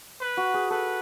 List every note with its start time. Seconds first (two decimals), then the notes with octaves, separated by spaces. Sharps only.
0.21 B4
0.37 F#4
0.54 G#4
0.70 A4 B4